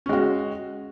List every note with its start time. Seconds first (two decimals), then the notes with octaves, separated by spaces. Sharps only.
0.06 C#4
0.09 G#3
0.13 F#4